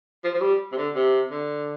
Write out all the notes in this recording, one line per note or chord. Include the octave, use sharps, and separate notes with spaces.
F3
F3
G3
C3
D3
C3
D3